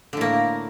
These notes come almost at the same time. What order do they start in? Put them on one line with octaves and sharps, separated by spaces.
D3 A2 A#3